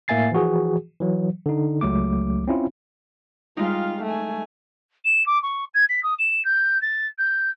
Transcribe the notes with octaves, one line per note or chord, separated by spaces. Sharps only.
A2 A#3 E5 G#5 A6 C7
E3 F3 F#4 G#4
E3 F#3
D3 D#4
C#2 F#3 A3 D6
C4 C#4 E4 F4
G3 G#3 D#4 F4 F5
A3 G#5
E7
D6
C#6
G#6
B6
D#6
E7
G6
A6
G6